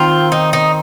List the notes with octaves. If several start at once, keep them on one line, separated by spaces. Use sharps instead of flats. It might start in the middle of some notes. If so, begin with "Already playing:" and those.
Already playing: D#3 C4 F4
D#4
D#4